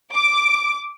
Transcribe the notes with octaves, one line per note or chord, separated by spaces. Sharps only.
D6